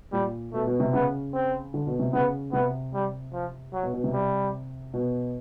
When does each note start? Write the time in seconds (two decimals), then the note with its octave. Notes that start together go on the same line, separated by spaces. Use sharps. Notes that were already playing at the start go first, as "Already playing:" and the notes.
0.13 A#2 G3
0.53 B2 A3
0.67 B2
0.80 C3
0.93 C#3 B3
1.33 C4
1.74 D3
1.87 B2
1.99 C3
2.13 C#3 B3
2.53 C3 B3
2.94 G3
3.33 F3
3.73 F#3
3.83 B2
3.93 B2
4.04 C3
4.13 G3
4.94 B2